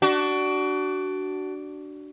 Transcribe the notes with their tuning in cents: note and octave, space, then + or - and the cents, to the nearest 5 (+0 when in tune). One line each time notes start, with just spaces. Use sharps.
D4 +0 F#4 +25